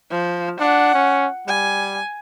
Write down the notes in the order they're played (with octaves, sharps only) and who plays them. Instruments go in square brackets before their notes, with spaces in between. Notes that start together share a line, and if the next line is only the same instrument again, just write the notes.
[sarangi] F3
[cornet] D4 [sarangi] F#5
[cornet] C#4
[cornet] G3 [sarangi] G#5